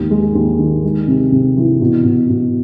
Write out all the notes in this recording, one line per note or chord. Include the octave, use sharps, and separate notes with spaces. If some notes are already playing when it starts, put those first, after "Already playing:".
Already playing: D#2 G#2
G#3
D#2
D#3
G#3
C3
C3
E3
B2
B2
B2